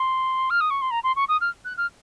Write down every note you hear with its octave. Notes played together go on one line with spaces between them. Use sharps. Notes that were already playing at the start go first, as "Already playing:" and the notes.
Already playing: C6
F6
D#6
C#6
C6
A#5
C6
C#6
D#6
F6
F#6
F6